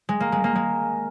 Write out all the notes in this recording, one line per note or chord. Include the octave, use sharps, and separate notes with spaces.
G#3
A#3
G#3
A#3
G#3